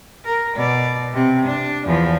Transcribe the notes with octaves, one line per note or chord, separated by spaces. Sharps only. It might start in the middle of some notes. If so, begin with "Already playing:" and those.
A#4
B2 D5
C3 C4
D4
E2 F3